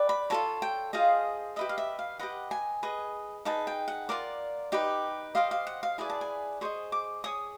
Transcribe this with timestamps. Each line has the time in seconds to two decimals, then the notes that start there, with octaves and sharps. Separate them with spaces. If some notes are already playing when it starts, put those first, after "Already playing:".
Already playing: G4 B4 D5
0.09 B5
0.30 F4 A4 C#5 A5
0.62 G5
0.93 F4 G#4 C5 D#5 F5
1.56 G4 B4 D#5 E5
1.69 F5
1.78 E5
1.99 F5
2.19 G4 B4 D#5 F#5
2.51 G#5
2.83 G#4 B4 D#5
3.45 D#4 G#4 B4 A5
3.67 G5
3.88 F#5
4.09 F4 A#4 D5
4.72 D#4 G4 B4
5.35 G4 C5 D#5 F5
5.51 F5
5.67 F#5
5.83 F5
5.98 E4 G#4 B4 D5 G#5
6.10 A5
6.21 G#5
6.61 G#4 C5 D#5 C#6
6.92 D6
7.24 G#4 C#5 D#6